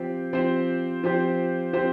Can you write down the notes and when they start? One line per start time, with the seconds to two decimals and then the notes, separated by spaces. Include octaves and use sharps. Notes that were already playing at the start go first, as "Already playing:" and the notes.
Already playing: F3 C4 G4
0.33 F3 C4 G4 C5
1.03 F3 C4 G4 C5
1.73 F3 C4 G4 C5